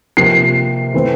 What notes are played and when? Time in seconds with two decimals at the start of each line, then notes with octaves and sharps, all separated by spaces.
0.17 C3 F3 A#3 C7
0.94 E3 A3 C4